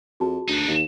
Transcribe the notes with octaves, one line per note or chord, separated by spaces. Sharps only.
F2 F#4 G#4 A5
D2 D4 D#4
D#2